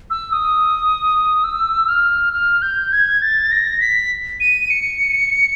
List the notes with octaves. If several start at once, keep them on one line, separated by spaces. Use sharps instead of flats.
E6
D#6
E6
F6
F6
G6
G#6
A6
A#6
B6
D#7
C#7